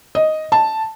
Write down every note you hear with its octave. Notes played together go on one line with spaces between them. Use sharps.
D#5
A5